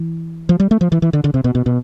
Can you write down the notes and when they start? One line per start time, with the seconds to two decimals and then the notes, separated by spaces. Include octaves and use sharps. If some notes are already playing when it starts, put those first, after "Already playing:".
Already playing: E3
0.49 F3
0.60 G3
0.71 A3
0.81 F3
0.92 E3
1.02 E3
1.13 D3
1.24 D3
1.34 C3
1.44 B2
1.55 B2
1.66 B2